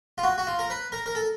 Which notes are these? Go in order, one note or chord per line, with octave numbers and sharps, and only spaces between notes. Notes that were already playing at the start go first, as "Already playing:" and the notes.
F4
F#4
F#4
F4
A#4
B4
A#4
A#4
A4